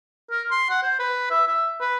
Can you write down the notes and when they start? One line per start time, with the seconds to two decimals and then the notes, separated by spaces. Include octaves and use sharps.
0.31 A#4
0.51 C6
0.70 F#5
0.83 C5
0.99 B4
1.31 E5
1.48 E5
1.80 B4